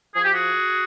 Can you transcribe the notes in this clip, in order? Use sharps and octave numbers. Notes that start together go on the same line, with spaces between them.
F3 G#4
G4
F#4 G#4